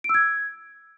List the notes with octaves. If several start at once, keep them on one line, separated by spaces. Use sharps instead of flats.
D7
E6
G#6